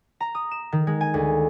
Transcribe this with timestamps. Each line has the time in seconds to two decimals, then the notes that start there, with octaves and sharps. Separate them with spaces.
0.20 A#5
0.35 D#6
0.51 E7
0.72 D#3
0.87 G#3
1.01 G#5
1.14 D2